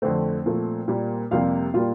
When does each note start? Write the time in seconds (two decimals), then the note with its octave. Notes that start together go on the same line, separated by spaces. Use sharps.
0.02 F2 D3 A3 C4 C5
0.46 A#2 F3 A3
0.88 A#2 G3 A#3
1.31 F2 C3 G3 A#3 F4 F5
1.74 A#2 G3 A#3 F4 F5